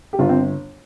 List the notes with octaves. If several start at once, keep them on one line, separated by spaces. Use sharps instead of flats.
G4
G1 F4
C4